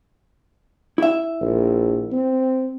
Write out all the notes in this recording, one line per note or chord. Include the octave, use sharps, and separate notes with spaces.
E4 E5
A#1
C4